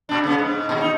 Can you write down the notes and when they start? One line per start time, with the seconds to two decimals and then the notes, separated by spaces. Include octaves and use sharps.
0.09 A#2 D4
0.24 C#3 B3
0.38 G#2
0.69 D#2 A#2
0.81 D#4